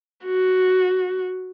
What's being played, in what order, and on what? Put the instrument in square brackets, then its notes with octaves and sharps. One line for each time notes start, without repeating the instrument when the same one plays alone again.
[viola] F#4